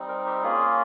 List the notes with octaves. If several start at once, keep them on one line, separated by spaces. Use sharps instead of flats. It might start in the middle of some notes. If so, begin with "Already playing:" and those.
Already playing: G3 C4 D#4
A#4
G4
A#3 C#4 F4 G#4